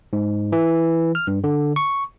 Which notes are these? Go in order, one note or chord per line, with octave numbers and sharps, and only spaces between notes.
G#2
E3
F6
G2
D3
C#6